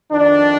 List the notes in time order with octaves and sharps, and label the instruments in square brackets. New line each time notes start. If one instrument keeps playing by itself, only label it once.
[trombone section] F2 D#3 D4